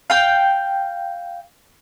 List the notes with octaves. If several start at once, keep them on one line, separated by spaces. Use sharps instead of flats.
F5 G5